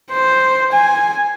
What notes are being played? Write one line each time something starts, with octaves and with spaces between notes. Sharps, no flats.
C5
G#5